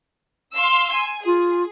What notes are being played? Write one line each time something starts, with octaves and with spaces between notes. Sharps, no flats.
F5 C6 E6
G#5
F4 G#4